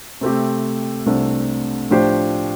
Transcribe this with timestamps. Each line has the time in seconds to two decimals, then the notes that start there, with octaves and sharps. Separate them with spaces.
0.21 C3 A3 C4 G4
1.06 C2 C3 A3 D4 A4
1.90 A2 F3 D4 G4 C5